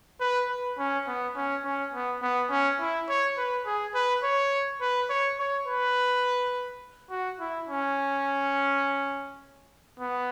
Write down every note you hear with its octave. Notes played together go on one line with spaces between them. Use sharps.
B4
B4
C#4
B3
C#4
C#4
B3
B3
C#4
E4
C#5
B4
G#4
B4
C#5
B4
C#5
C#5
B4
F#4
E4
C#4
B3